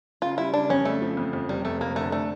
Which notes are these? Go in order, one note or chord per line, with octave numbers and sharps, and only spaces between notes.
C#3 F4
G3 E4
C#3 D4
F2 C#4
C#3 A3
F3
F2
F2
F1 G3
F2 A3
F1 A#3
D3 A3
A3 D4